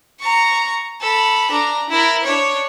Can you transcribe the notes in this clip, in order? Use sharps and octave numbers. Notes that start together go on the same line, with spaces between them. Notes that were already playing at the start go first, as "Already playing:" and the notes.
A#5 C#6
A4 B5
D4 A#5
E4 A#4
D4 C#5